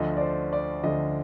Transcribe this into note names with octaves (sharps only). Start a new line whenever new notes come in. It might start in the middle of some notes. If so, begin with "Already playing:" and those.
Already playing: D2 D3 F3 D#5
D5
C5
D5
D2 D3 F3 D#5